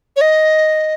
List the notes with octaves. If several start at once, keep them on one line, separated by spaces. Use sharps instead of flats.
C#5
D#5